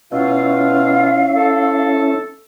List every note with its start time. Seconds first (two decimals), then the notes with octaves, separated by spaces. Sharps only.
0.12 B2 C#4 E4 F4 F5
1.35 A4